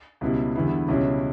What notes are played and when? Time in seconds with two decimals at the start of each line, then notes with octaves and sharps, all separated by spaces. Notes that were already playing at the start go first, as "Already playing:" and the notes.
0.21 C#2 B2 G3 B3 E4
0.56 E2 D3 G3 B3 E4
0.88 C#2 B2 G3 C#4 E4